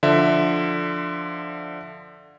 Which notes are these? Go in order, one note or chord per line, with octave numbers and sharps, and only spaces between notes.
D3 F3 E5